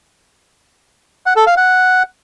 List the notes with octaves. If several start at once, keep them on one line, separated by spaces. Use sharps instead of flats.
F#5
A4
F5
F#5